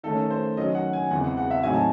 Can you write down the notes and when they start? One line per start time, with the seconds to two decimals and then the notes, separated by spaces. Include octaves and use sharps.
0.03 D#3 A3 C#4 A4
0.30 C5
0.57 D#3 F#3 C#4 D#5
0.75 F#5
0.93 G#5
1.11 E2 C#3 E3 G#3 C4 F#5
1.24 F#5
1.37 F#5
1.50 E5
1.63 A2 F#3 C4 D#4 G#5
1.73 A5